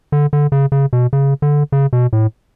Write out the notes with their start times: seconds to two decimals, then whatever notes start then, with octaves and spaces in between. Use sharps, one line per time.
0.12 D3
0.33 D3
0.52 C#3
0.72 C#3
0.93 B2
1.13 C#3
1.42 D3
1.72 C#3
1.93 B2
2.13 A2